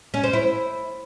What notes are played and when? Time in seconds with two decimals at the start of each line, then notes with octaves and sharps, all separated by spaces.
0.14 C#4
0.24 C5
0.33 E4